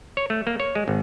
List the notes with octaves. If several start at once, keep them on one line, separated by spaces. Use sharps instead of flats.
C#5
A3
A#3
C#5
G#3
G#1